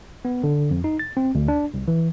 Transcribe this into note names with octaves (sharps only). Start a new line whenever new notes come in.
B3
D3
F2
D#4
A6
C4
D2
D4
C2
E3